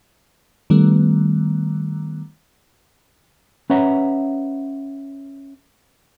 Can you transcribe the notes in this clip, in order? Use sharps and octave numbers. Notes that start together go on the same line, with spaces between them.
D#3 G3 A3 B3
C#4 B4 C#5 E5 F#5 A#5